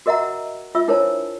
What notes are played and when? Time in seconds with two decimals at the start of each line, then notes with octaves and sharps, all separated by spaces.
0.06 F#4 A#4 D#5 E5 F#5 A#5
0.75 F4 E5 E6
0.88 D4 E4 A#4 C5 C#5 A5